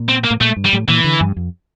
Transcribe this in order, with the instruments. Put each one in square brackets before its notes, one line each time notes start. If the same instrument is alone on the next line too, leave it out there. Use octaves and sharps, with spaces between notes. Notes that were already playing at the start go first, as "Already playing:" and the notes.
Already playing: [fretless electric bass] A#2
[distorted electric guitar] C4
A#3
[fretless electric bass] A2
[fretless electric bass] A#2 [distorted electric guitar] A3
[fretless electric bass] G2
[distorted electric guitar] G3
[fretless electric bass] A2
[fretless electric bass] A#2 [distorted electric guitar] E3
[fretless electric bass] D3
G2
F2